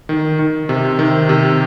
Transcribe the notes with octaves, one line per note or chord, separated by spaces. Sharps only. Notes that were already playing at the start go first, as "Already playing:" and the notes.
D#3
D#3
C3
D#3
C3